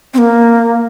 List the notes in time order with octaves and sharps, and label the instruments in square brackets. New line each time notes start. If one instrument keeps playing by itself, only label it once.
[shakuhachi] C4
A#3